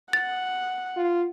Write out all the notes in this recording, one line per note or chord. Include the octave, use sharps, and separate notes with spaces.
F#5 A6
F4